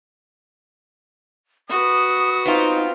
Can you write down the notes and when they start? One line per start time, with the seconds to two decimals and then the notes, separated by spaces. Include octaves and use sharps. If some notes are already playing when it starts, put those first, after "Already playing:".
1.69 F#4 B4 D#6
2.45 B3 C4 D#4 F4